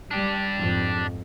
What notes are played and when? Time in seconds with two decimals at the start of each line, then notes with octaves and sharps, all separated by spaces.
0.11 G3 D4 G4
0.59 F2 G#2